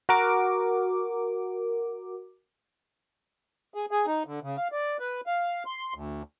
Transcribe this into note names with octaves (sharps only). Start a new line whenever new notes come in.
F#4 A#4 D6
G#4
G#4
D#4
D3
C#3
F5
D5
B4
F5
C6
D2